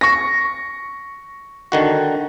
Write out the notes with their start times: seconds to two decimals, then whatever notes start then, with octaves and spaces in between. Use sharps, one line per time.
0.01 C#6 A#6
1.72 D3 D#3 F#4